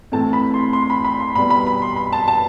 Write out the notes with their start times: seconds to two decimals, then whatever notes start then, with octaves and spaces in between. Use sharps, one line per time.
0.12 A2 E3 A3 C4 A5
0.33 B5
0.54 C6
0.73 C6
0.90 B5
1.04 B5
1.20 C6
1.35 B2 G3 B3 B5
1.50 B5
1.67 B5
1.82 C6
1.96 B5
2.13 A5
2.28 A5